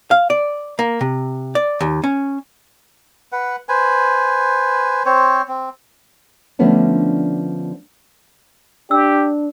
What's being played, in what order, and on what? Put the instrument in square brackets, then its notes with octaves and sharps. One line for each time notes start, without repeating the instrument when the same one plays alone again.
[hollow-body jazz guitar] F5
D5
A#3
C3
D5
D#2
C#4
[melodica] B4 F#5
B4 C5 G#5
C4 C5 C#5
C4
[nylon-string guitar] D3 F3 A3 B3 C#4 D4
[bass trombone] D4 [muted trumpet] G4 [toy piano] E6